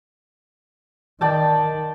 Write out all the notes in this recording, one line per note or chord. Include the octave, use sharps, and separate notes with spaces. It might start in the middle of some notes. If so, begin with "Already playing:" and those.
D#3 D5 G5 A5